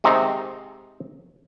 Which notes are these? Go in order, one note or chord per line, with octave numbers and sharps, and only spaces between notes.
G#2 C3 D#3 C4 D#4